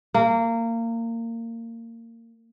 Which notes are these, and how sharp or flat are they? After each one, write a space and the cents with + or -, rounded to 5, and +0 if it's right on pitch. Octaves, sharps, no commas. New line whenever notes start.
A#3 -25